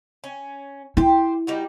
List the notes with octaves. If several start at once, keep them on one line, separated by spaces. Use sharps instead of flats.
C#4
E4 G4 C5
G3 D#4 F#4